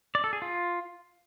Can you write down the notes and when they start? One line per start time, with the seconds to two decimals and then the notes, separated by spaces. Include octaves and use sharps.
0.15 D5
0.24 A4
0.33 G#4
0.42 F4